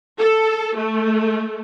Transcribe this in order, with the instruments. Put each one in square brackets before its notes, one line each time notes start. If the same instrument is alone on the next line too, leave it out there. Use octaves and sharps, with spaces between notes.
[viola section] A4
A3